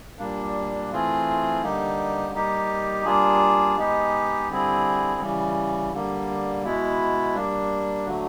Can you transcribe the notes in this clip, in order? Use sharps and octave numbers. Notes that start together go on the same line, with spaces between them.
A#2 G3 A#3 D4
E3 A3 C4 F4 G#4
D3 G3 A#3 D#4 G4
G3 A#3 D#4 G4
G3 A#3 D4 F4 G#4
G#3 B3 D#4 G4
D3 G3 C4 E4 G#4
C#3 E3 G3
D3 G3 A#3
B2 G#3 B3 E4
G3 A#3 D4
D3 F#3 A3